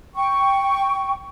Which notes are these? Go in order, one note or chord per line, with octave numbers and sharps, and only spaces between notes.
G5 C#6